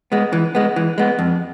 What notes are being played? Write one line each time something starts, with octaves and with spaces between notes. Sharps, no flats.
G#3 B3
E3
G#3 B3
E3
G#3 B3
F2